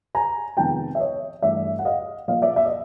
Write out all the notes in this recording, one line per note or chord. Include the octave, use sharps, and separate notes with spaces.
G#5 A#5
F2 C3 D#3 G#3 B3 G5 A5
E5
C#5 D#5
G2 E3 A3 D5 E5
F#5
D#5 F5
A#2 F3 A#3 D#5 F5
D5 E5
D5 E5
D#5